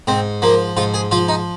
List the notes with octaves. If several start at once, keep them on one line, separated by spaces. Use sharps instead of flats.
G#2 C4
F3 A#3
G#2 F4
G#4
F3 F4
D#4